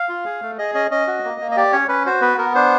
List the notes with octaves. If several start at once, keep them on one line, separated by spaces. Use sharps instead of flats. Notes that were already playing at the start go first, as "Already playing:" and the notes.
Already playing: F5
F4
G#4
A3
G#4 D#5
C#4 D#5
C#4 D#5
F#4
A#3
A#3
D#5
G4 D5
C#4 C#5
C#4 B4
F#4 C5
B3 B4
B3 A#4
D4 C5